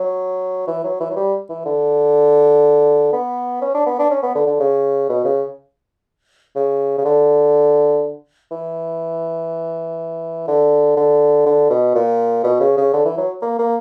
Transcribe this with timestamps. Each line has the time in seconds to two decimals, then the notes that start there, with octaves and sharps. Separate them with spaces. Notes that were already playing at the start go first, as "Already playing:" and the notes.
Already playing: F#3
0.67 E3
0.84 F#3
1.01 E3
1.10 F#3
1.16 G3
1.49 E3
1.66 D3
3.13 B3
3.62 C#4
3.75 D4
3.87 B3
3.99 D4
4.11 C#4
4.23 B3
4.35 D3
4.47 D3
4.60 C#3
5.09 B2
5.25 C#3
6.56 C#3
6.98 C#3
7.05 D3
8.51 E3
10.48 D3
10.97 D3
11.46 D3
11.70 B2
11.95 A#2
12.44 B2
12.60 C#3
12.77 C#3
12.93 D3
13.05 E3
13.18 F#3
13.42 A#3
13.59 A#3